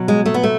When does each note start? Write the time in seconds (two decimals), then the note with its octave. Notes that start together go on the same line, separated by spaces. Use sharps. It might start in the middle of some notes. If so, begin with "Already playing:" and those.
Already playing: B2 F#3
0.08 G#3
0.26 A3
0.34 B3
0.43 A3